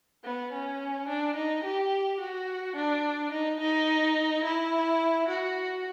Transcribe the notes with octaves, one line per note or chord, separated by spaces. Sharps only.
B3
C#4
D4
D#4
G4
F#4
D4
D#4
D#4
E4
F#4